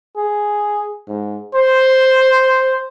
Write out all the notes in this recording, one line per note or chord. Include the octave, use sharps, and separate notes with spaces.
G#4
G#2
C5